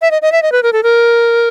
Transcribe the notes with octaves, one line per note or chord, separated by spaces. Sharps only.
E5
D#5
D#5
E5
D#5
B4
A#4
A4
A#4